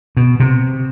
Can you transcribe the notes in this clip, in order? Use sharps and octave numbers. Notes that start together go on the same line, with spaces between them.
B2
C3